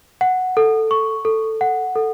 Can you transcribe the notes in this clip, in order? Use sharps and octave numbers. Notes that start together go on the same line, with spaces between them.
F#5
A4
C#6
A4
F#5
A4